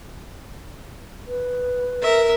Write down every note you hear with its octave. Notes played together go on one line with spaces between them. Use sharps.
B4
A#4 E5